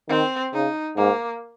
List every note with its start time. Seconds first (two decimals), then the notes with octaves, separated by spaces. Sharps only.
0.09 D#3 C4
0.53 C#3 D#4
0.97 G#2 A#3